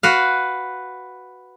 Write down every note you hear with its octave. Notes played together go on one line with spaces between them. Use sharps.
F#4 B4 F5